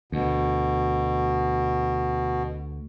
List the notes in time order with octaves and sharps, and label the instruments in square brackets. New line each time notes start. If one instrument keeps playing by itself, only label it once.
[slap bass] D2 [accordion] B2